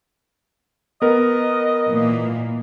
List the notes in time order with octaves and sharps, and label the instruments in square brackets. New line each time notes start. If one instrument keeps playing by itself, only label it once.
[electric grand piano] B3 A#4 [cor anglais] D#5
[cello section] A#2 E3 A#3